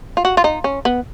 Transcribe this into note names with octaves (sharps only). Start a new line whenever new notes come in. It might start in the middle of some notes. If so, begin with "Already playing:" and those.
F4
F#4
F4
D#4
C#4
B3